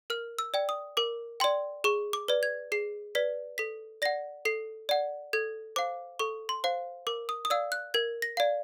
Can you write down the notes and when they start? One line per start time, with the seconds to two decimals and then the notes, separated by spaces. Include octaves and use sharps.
0.10 A#4 F6
0.39 E6
0.54 D5 G5
0.69 D#6
0.97 A#4 D6
1.40 D5 G5 C6
1.84 G#4 C#6
2.13 D6
2.28 B4 D5
2.43 G#6
2.72 G#4 C7
3.15 B4 D5 B6
3.58 A4 B6
4.02 D5 F#5 A#6
4.45 A4 C7
4.89 D5 F#5
5.33 A4 G#6
5.76 C5 F5 D6
6.19 A4 C#6
6.49 C6
6.64 C5 F5
7.07 A#4 D6
7.29 D#6
7.45 D#6
7.50 D5 F5 E6
7.72 F#6
7.94 A#4 G#6
8.22 A#6
8.37 D5 F5